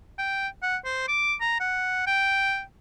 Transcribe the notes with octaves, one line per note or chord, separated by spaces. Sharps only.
G5
F#5
C5
D6
A#5
F#5
G5